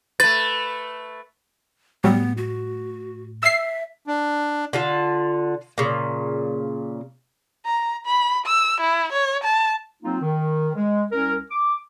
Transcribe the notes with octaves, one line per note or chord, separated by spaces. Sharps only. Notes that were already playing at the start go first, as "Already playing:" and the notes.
A3 B4 A6
A2 F#3 G3 B3
F#4
E5 E6 C7
D4
D3 F4 A5
A#2 C#3
A#5
B5
E6
E4
C#5
A5
F#3 A#3 C4 D#4 F4
D#3
G#3
C2 C#4 A#4
D6